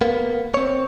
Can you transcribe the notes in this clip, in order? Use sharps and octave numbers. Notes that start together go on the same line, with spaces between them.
A#3 B3
C4 C#5